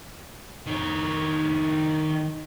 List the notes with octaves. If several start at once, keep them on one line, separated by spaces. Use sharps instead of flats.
D#3 C#5